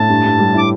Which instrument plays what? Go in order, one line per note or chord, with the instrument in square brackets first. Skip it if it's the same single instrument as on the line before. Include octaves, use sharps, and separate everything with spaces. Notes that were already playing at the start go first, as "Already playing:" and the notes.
Already playing: [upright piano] A2 [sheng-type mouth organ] A5
[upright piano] G2
G2
G3
[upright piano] E4 [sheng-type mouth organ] D6